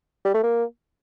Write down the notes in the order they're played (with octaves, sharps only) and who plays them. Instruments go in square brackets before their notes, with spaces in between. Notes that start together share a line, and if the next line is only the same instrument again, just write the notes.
[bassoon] G3
A3
A#3